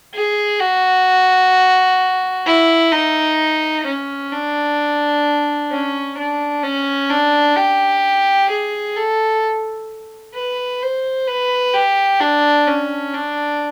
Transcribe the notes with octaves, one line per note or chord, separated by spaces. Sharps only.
G#4
F#4
E4
D#4
C#4
D4
C#4
D4
C#4
D4
G4
G#4
A4
B4
C5
B4
G4
D4
C#4
D4